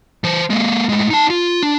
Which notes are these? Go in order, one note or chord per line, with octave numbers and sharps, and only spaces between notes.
E3 C5
G#3 A#3
A2 G#3
D#4 A5
F4
D4